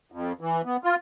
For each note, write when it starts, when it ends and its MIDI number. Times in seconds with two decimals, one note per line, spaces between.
0.12 0.32 41
0.41 0.62 52
0.65 0.77 59
0.84 0.95 65